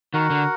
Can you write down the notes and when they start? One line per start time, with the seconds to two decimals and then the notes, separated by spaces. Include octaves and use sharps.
0.13 D#3 F#4 A#4 F#5
0.30 D3